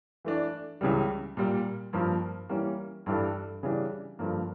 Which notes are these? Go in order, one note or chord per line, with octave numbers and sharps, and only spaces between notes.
E3 A3 D4
C#2 C#3 E3 G3
A#2 G3 A#3
G2 F3 A#3
E3 G3 A#3 C#4
G2 E3 G3 D4 A4
C#3 E3 G3 D4
G2 D3 F3 A#3